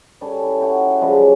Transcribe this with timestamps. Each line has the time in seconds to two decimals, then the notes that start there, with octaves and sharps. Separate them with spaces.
0.21 G3 C#4 A4
0.43 E4
0.61 F#4 G5 A#5
0.87 E5 F#5
1.01 C#3 F3 G3 G#3
1.16 F#3